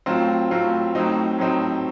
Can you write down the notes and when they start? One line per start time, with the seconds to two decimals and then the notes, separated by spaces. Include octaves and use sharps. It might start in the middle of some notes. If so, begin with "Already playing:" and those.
0.06 A2 F#3 C4 F4
0.51 A2 F#3 C4 F4
0.95 A2 F#3 C4 D#4
1.38 A2 F#3 C4 D#4